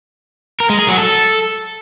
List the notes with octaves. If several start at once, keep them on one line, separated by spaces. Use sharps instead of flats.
A#4
G#3
G#4
F#3
A4